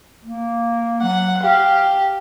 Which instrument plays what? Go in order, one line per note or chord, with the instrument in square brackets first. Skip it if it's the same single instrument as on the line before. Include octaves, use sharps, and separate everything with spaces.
[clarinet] A#3
[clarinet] F#3 [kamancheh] F#5
[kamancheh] G4 [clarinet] F5